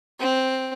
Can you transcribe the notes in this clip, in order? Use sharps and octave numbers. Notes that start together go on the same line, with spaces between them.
C4